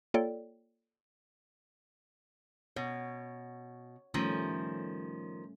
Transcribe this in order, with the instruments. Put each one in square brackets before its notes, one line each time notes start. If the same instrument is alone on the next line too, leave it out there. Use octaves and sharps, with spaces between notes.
[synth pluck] A#3 F4 A4 C#5 D5 G5
[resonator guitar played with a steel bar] B2 [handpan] C#5
[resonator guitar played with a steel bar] D#3 F3 [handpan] G3 A3 C#4